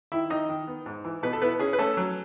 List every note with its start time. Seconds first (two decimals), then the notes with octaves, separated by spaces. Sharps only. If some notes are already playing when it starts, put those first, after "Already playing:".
0.12 D#3 E4 E5
0.30 D#3 D#4 D#5
0.49 D#3
0.67 B3
0.86 G#2
1.05 E3
1.23 B2 B3 B4
1.33 A4
1.42 B3 E4 B4
1.59 C#4 G#4
1.73 B4
1.79 A3 C#4 A4
1.97 F#3